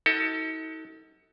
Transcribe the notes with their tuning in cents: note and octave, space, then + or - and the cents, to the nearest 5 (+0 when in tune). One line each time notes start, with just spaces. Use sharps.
D#4 +40 F#4 +15 A4 +25